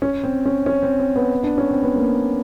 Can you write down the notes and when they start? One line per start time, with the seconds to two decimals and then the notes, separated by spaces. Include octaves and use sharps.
0.02 C#4
0.24 C4
0.46 C#4
0.66 C#4
0.83 C4
1.00 C4
1.16 B3
1.43 D4
1.58 C#4
1.71 C4
1.83 B3
1.96 A#3